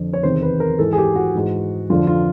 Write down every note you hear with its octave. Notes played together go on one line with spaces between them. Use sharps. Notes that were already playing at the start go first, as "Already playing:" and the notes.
Already playing: F2 D3
C#5
E2 C3 D#3 C5
B4
A#4
G#2 E3 A4
G#4
G4
F#4
G#2 E3
F2 D3 F4
F4